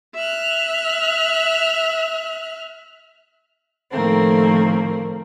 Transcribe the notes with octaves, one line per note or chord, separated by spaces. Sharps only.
E5 F6 F#6
A2 D#3 F3 A3 A#3 C4